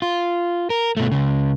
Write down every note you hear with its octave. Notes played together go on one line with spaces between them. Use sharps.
F4
A#4
B2 A3
C#2 C#3